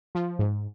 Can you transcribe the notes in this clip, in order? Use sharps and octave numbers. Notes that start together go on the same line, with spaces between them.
F3
G#2